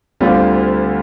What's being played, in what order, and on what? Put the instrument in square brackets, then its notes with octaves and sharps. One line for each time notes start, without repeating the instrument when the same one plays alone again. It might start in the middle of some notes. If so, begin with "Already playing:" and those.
[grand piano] D2 D3 G3 C4 F4